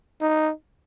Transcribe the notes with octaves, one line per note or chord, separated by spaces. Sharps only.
D#4